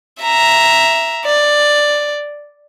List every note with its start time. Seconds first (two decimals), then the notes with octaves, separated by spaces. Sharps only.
0.22 E5 A#5
1.25 D5